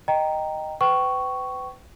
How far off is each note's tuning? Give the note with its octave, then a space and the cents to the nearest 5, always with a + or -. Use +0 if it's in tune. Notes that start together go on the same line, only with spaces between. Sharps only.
D#5 -5 G5 +0 A#5 +0
B4 +35 G5 -30 C#6 +0